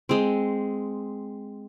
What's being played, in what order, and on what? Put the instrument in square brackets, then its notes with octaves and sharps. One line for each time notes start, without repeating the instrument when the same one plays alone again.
[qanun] G#3 C4